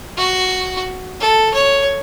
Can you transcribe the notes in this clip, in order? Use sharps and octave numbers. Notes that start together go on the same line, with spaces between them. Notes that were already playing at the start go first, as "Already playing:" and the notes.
F#4
A4
C#5